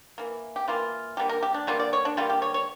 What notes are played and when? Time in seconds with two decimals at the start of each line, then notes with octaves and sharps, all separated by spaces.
0.18 E3 A#3
0.56 G4
0.68 E3 A#3 F4
1.17 D3 G3 A#3 G4
1.29 A#4
1.43 G4
1.54 D4
1.67 D3 G3 A#3 F4
1.80 D5
1.93 C#5
2.05 D4
2.17 D3 G3 A#3 F4
2.30 G4
2.42 C#5
2.54 C#5